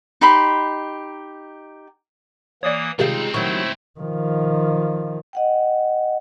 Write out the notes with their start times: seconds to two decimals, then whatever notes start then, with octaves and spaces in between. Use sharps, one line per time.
0.21 D#4 G4 B5 C6
2.63 E3 A#3 C#5 D5 D#6
2.99 C#2 C3 D#3 G3 G#3 C4 D#4 F4
3.34 D#3 F#3 G3 A3 E4 C5 C#6
3.99 D#3 F3
5.33 D#5 F#5 G5